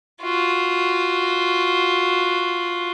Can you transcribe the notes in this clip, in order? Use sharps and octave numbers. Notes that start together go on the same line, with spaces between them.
F4 F#4